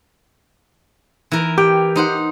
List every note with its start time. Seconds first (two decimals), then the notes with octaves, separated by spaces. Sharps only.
1.32 E3 A#4
1.58 G4 G5
1.96 D#4 C5 F#5